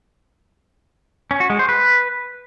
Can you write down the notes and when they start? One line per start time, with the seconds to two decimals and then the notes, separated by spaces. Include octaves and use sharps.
1.31 C#4
1.40 F#4
1.50 G#3
1.59 C5
1.69 B4